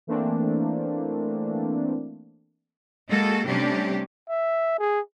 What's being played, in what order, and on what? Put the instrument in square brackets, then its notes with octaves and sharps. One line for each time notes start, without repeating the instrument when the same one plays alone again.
[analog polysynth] E3 A3 A#3 C4 D4
[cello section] G#3 A#3 F#4 A4
C3 G3 A3 C#4 D4 G4
[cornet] E5
G#4